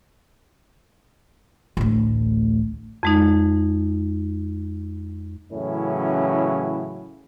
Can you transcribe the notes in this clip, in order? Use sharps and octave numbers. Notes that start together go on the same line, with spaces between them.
A1 D2
F2 G#3 D#4
A2 C#3 E3 F#3 C#4 E4